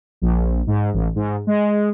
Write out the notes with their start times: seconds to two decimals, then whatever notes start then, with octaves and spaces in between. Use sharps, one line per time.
0.22 A#1
0.67 G#2
0.93 A1
1.16 G#2
1.47 G#3